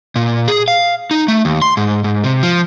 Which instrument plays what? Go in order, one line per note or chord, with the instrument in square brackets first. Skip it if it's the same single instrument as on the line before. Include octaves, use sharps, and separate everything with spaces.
[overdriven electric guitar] A#2
G#4
F5
D#4
A3
D#2
C6
G#2
G#2
C3
F3